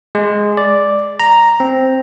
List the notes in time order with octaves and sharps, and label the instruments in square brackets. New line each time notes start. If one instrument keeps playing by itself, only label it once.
[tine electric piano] G#3
D5
A#5
C4